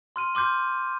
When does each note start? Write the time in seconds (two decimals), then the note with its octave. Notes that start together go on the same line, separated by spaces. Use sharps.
0.16 C6 F6 D#7
0.35 C6 D6 F6 G6